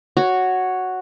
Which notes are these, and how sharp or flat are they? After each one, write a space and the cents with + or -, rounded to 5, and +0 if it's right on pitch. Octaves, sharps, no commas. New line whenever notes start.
F#4 +0 C#5 +0